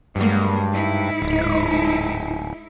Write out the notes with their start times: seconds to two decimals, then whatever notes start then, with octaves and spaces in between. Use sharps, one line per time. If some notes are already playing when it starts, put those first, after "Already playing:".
0.16 G2 F#3 G#3 A#3
0.72 G#2 D#4 E4
1.22 D1